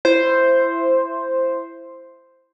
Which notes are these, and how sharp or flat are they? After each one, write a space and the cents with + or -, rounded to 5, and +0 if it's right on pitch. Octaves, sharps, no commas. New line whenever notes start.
E4 +20 C5 +0